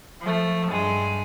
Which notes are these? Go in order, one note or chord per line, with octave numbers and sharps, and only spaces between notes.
F3 A3
G2 G#3